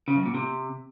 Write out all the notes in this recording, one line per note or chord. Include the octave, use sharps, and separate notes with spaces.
C#3
F#2
A#2
C3